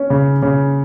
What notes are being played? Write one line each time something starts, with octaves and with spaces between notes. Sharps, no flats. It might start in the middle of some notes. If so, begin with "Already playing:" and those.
Already playing: C#4
C#3
C#3